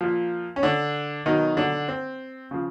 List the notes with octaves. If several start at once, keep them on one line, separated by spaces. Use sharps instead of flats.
A#2 F3
C#4
D3 D4
B2 D#3 F#3 D#4
D3 D4
C4
C#3 F3